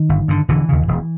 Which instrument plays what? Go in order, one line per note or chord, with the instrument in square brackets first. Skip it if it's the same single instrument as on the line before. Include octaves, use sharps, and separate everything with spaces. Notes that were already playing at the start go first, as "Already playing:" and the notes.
Already playing: [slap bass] D#3
G1
G2 D3
E1 D3 E3
D#2 C#3
E1